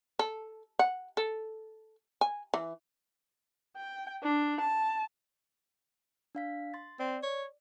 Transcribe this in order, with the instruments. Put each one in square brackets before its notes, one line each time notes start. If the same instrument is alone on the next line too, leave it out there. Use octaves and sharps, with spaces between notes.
[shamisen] A4
F#5
A4
G#5
E3
[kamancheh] G5
D4
A5
[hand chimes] D4 F5 B6
C6 A6
[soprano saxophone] C4 [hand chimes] D5
[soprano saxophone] C#5